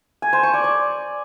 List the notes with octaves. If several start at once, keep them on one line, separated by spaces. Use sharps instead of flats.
G#5
C5
C#6
D5
D5